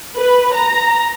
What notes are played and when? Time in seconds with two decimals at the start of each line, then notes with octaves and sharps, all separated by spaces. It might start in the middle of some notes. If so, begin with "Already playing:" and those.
0.15 B4
0.54 A#5